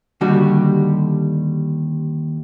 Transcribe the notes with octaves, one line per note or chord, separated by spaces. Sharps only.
D#2 D3 G3 F#4